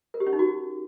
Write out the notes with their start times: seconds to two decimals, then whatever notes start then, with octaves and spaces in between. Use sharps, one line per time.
0.14 A#4
0.20 G4
0.27 C#4
0.33 D#4
0.39 F#4